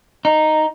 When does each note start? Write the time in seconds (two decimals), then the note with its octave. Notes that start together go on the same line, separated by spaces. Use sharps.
0.25 D#4